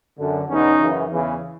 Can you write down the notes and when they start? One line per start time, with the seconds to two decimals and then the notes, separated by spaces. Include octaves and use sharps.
0.17 F#2 D3
0.48 E2 B2 C#4 D#4
0.79 F#2 C#3 E3
1.11 E2 C#3 E3